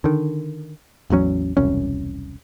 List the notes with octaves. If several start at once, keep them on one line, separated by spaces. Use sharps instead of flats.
D3 D#3
A1 E2 F#3 C#4
E1 C2 F#2 C#4